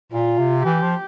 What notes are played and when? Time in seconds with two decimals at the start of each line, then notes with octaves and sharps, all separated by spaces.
0.12 A#2 F4
0.39 C3
0.64 E3 G4
0.82 F3